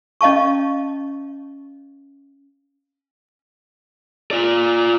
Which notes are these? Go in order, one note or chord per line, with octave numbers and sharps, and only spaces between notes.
C#4 D#5 F5 A5 C#6
F4 D5